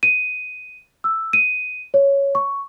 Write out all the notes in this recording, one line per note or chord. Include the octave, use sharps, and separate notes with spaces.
D#7
E6
D#7
C#5
C#6